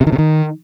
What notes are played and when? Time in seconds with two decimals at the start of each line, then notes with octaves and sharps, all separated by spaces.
0.01 C3
0.07 D#3
0.13 C3
0.18 D#3